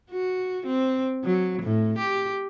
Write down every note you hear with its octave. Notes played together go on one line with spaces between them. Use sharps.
F#4
C4
F#3
A2
G4